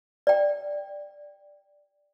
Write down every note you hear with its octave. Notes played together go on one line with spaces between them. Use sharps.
D5 G5